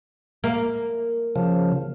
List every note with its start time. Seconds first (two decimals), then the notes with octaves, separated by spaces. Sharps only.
0.44 A#3
1.36 C#3 F3